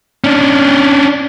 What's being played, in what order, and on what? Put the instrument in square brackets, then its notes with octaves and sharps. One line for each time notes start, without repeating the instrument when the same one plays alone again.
[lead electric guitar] C#4 D4